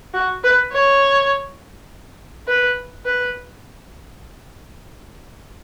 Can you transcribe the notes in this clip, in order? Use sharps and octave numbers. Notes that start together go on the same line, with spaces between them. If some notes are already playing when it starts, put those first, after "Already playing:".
F#4
B4
C#5
B4
B4